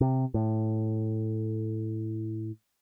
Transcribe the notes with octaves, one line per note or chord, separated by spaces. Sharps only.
C3
A2